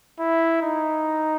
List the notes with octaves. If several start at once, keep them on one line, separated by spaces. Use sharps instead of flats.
E4
D#4